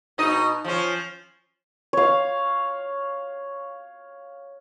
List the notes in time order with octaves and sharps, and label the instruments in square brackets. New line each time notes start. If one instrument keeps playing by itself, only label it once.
[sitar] B2 D#4 D#5
F3 C#4
[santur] C#5 F5